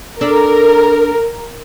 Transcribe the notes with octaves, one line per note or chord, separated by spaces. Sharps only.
D4 A4 A#4 D5